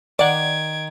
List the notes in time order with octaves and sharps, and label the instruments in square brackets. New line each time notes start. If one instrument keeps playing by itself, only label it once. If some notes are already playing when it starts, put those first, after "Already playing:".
[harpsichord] D#3 [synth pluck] D5 F#5 [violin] G#6 D7